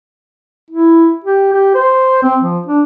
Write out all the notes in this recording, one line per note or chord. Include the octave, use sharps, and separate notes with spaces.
E4
G4
G4
C5
C4
F3
D4